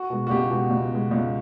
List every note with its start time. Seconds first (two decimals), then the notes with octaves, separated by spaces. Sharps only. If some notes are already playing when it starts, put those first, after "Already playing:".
Already playing: F#4
0.10 B2 G#3
0.27 F#4
0.30 C#2 G4
0.50 B2 G#3
0.71 C#2
0.91 B2 G#3
1.11 C#2